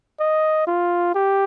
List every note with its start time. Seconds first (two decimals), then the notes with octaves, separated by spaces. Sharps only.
0.20 D#5
0.67 F4
1.15 G4